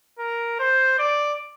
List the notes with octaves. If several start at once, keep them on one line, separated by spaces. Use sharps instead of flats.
A#4
C5
D5